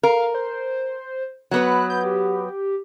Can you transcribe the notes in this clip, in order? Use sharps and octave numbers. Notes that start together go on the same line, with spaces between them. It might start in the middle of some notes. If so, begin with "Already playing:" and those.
A#4 F5
C5
F#3 B3 B4 F#6
G6
G4